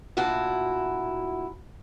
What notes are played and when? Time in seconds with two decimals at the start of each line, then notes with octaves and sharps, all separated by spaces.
0.17 D2 A#2 E4 F#4 A5